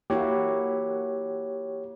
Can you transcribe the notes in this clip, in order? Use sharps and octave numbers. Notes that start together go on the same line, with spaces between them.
A#3 E4 F#4 G4 C#5